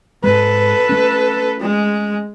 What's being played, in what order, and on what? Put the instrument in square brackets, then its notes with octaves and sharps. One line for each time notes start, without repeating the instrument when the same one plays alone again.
[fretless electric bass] G#2 G#3 [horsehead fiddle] A4 B4
[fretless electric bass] A3 C#4
[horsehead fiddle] G#3